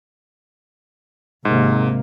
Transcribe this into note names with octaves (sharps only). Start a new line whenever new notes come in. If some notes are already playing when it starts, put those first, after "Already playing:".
G#1 G#2 C3 A#3